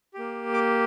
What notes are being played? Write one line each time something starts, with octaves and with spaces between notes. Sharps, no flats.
A#3 G4
D6